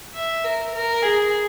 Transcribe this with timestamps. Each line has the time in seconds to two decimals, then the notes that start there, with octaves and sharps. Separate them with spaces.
0.14 E5
0.44 A#4
0.74 A#4
1.02 G#4